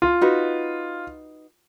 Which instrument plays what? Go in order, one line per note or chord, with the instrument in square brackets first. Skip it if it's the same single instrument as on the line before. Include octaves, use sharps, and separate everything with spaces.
[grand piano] F4
[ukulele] D#4 F#4 B4